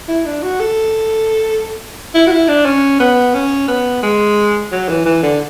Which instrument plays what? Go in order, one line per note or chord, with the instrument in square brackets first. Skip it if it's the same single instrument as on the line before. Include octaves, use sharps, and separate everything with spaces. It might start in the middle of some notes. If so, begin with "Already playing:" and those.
[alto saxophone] E4
D4
F#4
A4
E4
F#4
E4
D4
C#4
B3
C#4
B3
G#3
F#3
E3
E3
D3